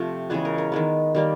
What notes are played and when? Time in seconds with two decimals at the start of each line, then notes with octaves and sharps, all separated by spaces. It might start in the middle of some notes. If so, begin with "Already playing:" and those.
Already playing: C3 F3 A3
0.30 C#3 E3 G#3 B3 G#4
0.45 A#4
0.58 A#4
0.72 D#3 G#3 B3
1.15 D#3 G3 A#3